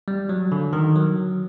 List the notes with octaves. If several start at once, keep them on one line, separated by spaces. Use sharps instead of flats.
G3
F#3
D3
D#3
F#3